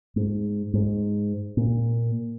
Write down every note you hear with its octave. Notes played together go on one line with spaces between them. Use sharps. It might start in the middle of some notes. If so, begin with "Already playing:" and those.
G#2
G#2
A#2